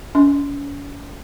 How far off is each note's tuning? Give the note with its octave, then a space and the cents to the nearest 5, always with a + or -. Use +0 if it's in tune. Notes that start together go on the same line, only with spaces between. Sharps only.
C#4 +35